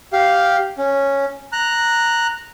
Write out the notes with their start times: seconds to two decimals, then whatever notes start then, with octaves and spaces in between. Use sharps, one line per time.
0.13 G4 F5
0.78 C#4
1.53 A#5 F#6